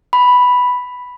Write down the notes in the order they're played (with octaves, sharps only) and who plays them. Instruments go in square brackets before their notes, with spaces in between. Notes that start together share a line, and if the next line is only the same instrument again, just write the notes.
[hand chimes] B5